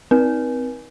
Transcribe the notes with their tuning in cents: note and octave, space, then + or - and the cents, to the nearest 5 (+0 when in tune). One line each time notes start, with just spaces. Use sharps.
C4 -20 B4 -45